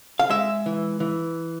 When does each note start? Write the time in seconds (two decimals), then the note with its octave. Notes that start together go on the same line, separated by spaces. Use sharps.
0.19 F5
0.29 G#3 E5
0.66 E3
1.00 E3